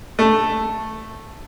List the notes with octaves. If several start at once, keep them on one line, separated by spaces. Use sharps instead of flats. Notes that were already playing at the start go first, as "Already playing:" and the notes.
A3